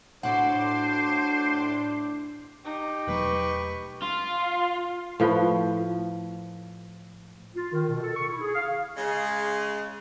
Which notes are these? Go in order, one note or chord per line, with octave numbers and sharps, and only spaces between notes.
A2 D4 F#4 C5 C6 D6
D#4 G4
E1 F#3 A3 B4 C#6
F4
A2 F3 B4
F4
D#3
B2
A4
C#6
E4
G#4
F5
C#3 G#3